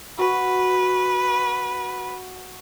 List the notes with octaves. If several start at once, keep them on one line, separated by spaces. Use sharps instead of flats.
F#4 B4